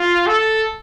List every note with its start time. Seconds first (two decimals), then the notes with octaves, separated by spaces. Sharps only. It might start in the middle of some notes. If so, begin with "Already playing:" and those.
Already playing: F4
0.27 A4